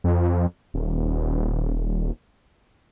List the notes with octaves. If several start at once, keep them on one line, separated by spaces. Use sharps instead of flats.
F2
D#1